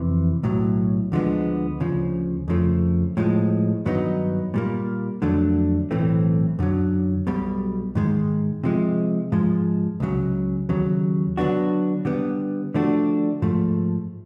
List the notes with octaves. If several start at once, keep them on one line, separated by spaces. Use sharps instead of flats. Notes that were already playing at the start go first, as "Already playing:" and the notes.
Already playing: F2 C3 E3
B1 A2 F#3
D2 D3 F3 G#3 B3
D2 C#3 F3
F2 C#3 F3 A3
A2 F3 G#3
G2 D#3 F#3 B3 D#4
A#2 G3 A#3
F2 D3 F#3 A3 D4
B1 A2 E3 A3 C4
F#2 D3 F#3
B1 B2 G3
G#2 D#3 G#3
C3 F3 G#3
G#2 F3 G#3
C#2 C#3 F#3
D#2 C#3 F#3
D3 F#3 B3 D4 F#4
D3 G3 B3
D3 F3 A3 D4 F#4
G#2 F3 A3